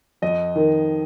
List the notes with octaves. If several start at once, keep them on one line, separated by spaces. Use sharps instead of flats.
F2 D#5
D#3